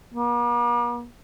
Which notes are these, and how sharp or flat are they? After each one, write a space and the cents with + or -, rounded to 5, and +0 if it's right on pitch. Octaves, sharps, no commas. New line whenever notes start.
A#3 +45